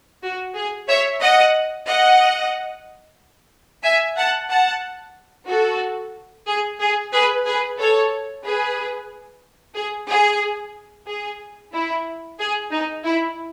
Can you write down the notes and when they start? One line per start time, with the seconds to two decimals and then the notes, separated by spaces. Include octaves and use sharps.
0.23 F#4
0.56 G#4
0.89 C#5 E5
1.21 D#5 F#5
1.87 D#5 F#5
3.84 E5 G#5
4.17 F#5 A5
4.50 F#5 A5
5.48 F#4 A4
6.47 G#4
6.81 G#4
7.13 G#4 B4
7.46 G#4 B4
7.79 A4 C#5
8.45 G#4 B4
9.76 G#4
10.10 G#4
11.08 G#4
11.73 E4
12.40 G#4
12.72 D#4
13.05 E4